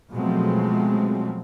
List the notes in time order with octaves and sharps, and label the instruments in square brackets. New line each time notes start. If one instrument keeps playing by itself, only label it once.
[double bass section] B2 F3 F#3 G#3 A3 C4